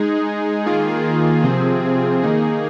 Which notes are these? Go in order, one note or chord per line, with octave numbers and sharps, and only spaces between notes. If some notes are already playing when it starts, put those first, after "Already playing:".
Already playing: G#3 D#4 G#4
D#3 A#3 F4 G#4
C3 F3 C4 G#4
D#3 A#3 D#4 G#4